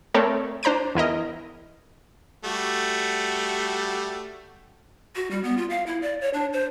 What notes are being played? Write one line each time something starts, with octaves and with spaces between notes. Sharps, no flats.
A3 C4 A4 A#4 C#5 D5
D4 C5 A#5 G6 D7
E2 E4 A#4 D#5
G3 A3 F#4
F#4
G3
B3
F4
F5
E4
D5
C#5
D4
C5